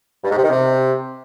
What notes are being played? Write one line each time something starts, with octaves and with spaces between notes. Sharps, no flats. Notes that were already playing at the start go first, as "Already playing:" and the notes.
G2
G#2
C3
D#3
C3